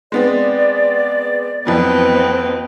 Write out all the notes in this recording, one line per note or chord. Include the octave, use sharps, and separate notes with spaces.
G#3 B3 C4 D5
F2 E3 F#3 B3 C4 B4